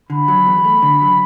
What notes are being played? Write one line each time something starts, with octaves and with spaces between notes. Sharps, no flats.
D3 B5
F#3
E2
A3
D3
F#3